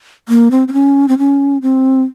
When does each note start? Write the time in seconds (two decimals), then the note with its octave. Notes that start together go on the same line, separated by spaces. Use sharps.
0.29 A#3
0.51 C4
0.68 C4
0.73 C#4
1.08 C4
1.18 C#4
1.62 C4